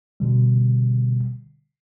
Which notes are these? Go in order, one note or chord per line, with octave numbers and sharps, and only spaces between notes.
B2 D3 G3